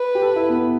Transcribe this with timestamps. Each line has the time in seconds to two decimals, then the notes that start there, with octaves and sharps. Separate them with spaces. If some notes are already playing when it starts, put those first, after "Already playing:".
Already playing: B4
0.15 G4
0.22 A4
0.36 E4
0.49 B3